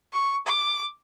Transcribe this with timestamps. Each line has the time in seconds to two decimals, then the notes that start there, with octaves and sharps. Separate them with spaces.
0.13 C#6
0.47 D6